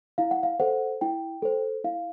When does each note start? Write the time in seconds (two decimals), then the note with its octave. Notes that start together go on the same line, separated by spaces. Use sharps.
0.18 E4 F5
0.31 F#5
0.43 F5
0.60 A4 C5 F#5
1.01 E4 G5
1.42 A4 C5
1.84 E4 F5